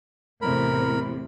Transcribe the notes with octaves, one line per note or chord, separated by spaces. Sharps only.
E2 A2 C3 A#4 B5